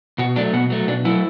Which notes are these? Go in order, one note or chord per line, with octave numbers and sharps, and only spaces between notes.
B2 F#4
F#3 A3 D4
B2 B3
F#3 A3
B2 D4
F#3 A3 E4